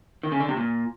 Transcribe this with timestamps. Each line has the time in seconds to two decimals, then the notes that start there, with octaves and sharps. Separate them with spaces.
0.23 D#3
0.32 C#3
0.40 D3
0.48 C3
0.57 A#2